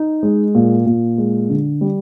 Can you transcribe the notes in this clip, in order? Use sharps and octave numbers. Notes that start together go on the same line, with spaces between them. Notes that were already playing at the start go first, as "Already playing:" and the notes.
Already playing: D#4
G#3
A#2
A#2
G#3
D3
G3